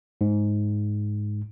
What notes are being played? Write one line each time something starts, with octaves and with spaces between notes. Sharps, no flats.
G#2